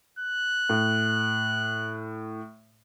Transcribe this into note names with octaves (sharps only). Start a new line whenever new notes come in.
F#6
A2